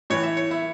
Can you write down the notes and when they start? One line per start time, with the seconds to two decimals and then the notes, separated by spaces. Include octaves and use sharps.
0.10 A2 E3 C#5
0.23 E5
0.37 C#5
0.51 E4